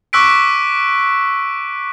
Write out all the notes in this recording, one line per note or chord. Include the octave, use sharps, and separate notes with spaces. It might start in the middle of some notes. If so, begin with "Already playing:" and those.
C#6 D6 E6 F#6 B6 D7